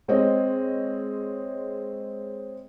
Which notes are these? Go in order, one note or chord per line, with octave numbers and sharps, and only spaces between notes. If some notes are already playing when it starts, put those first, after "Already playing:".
G#3 C4 C#5 D#5